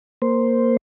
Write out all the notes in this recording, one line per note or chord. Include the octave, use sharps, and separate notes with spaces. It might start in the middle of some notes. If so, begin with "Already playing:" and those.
A#3 C5